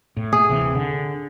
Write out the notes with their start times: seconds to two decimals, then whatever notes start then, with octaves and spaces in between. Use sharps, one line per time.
0.17 A2
0.33 G#4
0.49 D1 C3 E3
0.75 D3